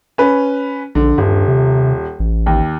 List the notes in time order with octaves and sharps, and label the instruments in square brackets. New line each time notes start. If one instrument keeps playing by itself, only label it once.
[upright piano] C#4 B4
[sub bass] A#1 [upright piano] D3
[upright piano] D#1 [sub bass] G2
[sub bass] C3
A1
[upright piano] D#2